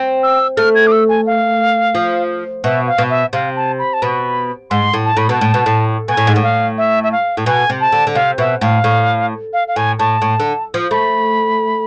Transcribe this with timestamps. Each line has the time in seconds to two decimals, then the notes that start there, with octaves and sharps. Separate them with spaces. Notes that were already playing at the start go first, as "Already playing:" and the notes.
Already playing: C4
0.23 E6
0.57 A3 F6
0.75 G#6
0.87 D6
0.92 E6
1.09 G#5
1.26 F5
1.95 F3
2.64 B2 E5
2.87 F5
2.98 B2
3.10 E5
3.33 C3 F5
3.56 A5
3.79 B5
3.93 A5
4.02 B2 B5
4.70 G#2 C6
4.93 A2
5.05 A5
5.17 A2 B5
5.29 B2 A5
5.41 A2
5.54 B2
5.66 A2
6.08 B2 G#5
6.17 A2
6.27 G#2
6.36 A2
6.43 F5
6.78 E5
7.03 E5
7.12 F5
7.37 A2
7.46 B2 G#5
7.70 C3
7.80 A5
7.92 D3
8.07 D3
8.15 C3 F5
8.38 B2 E5
8.61 A2 F5
8.84 A2
9.53 F5
9.68 F5
9.76 A2 G#5
9.99 A2 A5
10.22 A2
10.40 D3
10.74 F3
10.91 A3 B5